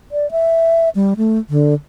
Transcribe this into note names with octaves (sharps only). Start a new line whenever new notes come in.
D5
E5
G3
A3
D3